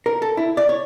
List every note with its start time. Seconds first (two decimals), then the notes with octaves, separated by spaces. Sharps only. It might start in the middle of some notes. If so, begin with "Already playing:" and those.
0.06 A#4
0.22 A4
0.37 E4
0.57 D5
0.69 C#5